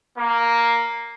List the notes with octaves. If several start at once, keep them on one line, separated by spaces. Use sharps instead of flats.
A#3